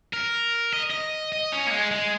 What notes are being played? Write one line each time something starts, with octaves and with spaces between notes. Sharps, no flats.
A#4
D#5
D#5
D#5
C#4
A#3
G#3
G#3